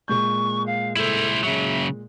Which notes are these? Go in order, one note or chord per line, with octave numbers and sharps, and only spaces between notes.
A#2 G#3 C#6 G6
F5
E4 A4 C5
C#3 F#3 E5